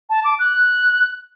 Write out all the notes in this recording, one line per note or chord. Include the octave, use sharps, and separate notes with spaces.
A5
D6
F#6